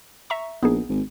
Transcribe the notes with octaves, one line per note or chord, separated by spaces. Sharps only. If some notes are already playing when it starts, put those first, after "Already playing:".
E5 A#5 C#6
A#1 B3 D#4 G#4
G#1